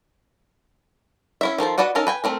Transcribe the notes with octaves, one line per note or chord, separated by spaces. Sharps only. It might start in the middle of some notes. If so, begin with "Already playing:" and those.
C#4 E4 E5
D#3 F3 A4 C5
F#4 B4 D5 D#5 F#5
C#4 D#4 A4 A#4
B4 G5 G#5
A3 C4 A#4